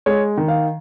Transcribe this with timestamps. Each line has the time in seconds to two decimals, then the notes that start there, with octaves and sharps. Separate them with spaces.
0.06 G#3 C#5
0.37 D#3
0.48 F5